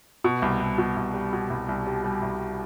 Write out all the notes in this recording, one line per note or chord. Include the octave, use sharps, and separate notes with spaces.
B2
C2
C2
B2
C2
G3
B2
C2
C2
G3
G3
C2